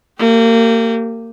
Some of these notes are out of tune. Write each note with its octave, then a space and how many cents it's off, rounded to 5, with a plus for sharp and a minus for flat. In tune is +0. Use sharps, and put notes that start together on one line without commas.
A#3 -30 G4 -10